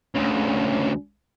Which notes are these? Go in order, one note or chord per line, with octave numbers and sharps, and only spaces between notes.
D2 C#3